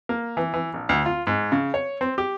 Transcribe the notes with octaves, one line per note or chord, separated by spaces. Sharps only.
A#3
E3
E3
A#1
D2
F4
G#2
C#3
C#5
C4
G4